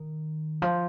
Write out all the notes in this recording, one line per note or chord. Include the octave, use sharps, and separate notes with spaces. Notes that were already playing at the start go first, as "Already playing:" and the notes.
Already playing: D#3
F3